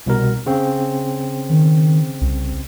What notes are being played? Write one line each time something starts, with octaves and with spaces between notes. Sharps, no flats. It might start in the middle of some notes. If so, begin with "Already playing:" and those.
C2 B2 A#4
C#3 C4
D#3
C2